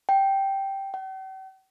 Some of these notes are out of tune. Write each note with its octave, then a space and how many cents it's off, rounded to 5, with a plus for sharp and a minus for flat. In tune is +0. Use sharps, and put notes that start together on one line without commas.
G5 -5
G5 -45